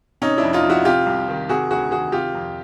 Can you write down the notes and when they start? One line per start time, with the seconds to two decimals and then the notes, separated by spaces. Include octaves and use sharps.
0.21 C3 C#4 D#4
0.38 D4 E4
0.43 F2
0.53 D#4 F4
0.64 F3
0.70 E4 F#4
0.85 C3 F4 G4
1.06 C2
1.28 D#3
1.49 C3 F#4 G#4
1.70 D2 F#4 G#4
1.91 D#3 F#4 G#4
2.12 C3 F4 G4
2.34 F2